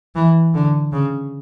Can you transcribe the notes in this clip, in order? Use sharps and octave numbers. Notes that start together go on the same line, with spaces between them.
E3
D3
C#3